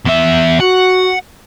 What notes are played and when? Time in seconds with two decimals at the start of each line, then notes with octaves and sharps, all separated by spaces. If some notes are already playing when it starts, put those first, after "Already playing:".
0.06 E2 E5
0.60 F#4 F#5